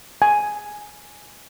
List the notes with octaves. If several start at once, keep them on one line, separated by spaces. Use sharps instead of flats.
G#5